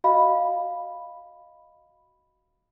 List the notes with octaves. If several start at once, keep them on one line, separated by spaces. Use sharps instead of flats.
F#4 D#5 F5 B5